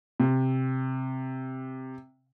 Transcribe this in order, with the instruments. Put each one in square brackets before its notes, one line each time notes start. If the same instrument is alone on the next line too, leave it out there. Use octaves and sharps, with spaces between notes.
[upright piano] C3